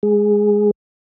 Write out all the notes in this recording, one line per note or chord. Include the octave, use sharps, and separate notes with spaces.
G#3 G#4